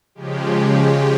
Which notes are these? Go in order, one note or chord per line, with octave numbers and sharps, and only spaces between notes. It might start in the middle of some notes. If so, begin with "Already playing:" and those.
C#3 F3 G#3 G4